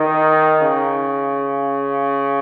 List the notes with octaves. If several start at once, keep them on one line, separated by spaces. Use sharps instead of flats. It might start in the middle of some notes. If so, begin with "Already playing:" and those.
Already playing: D#3
C#3